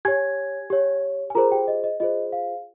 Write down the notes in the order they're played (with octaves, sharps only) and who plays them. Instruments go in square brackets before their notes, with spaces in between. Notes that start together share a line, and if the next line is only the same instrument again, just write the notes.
[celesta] G4 C#5 G#5 G#6
G4 C#5
G#5
F4 G#4 A#4 C5 A#5
G4 G5
D#5
D#5
F4 G#4 C5 D#5
F5